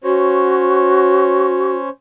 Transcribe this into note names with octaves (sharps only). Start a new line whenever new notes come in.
C#4 F#4 C5 C#5